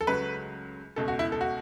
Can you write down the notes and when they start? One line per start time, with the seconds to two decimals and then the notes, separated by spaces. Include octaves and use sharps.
0.01 A4
0.07 C#2 C#3 F#3 A3 B4
0.96 C#2 B2 A3 A4
1.08 F#4
1.19 E4
1.32 A4
1.41 F#4